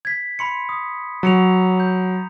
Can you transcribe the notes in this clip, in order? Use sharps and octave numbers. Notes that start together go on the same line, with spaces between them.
G#6 B6
B5 C6 C#7
D#6
F#3 A#5 C#7 F7
G6